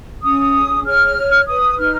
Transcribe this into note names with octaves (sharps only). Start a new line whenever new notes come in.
C#4 D#6
G#4
C#5 F6
C#5
B4 D#6
D#4 F6